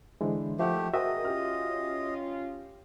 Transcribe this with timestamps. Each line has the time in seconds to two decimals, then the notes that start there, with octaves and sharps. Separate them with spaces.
0.21 D3 E3 G#3 D4 E4 C5
0.59 D#3 F3 A3 G4 E5 F#5
0.94 B2 F#4 G#4 A#4 C5 D#5 E5 G5
1.25 C#4 F4 G4 F6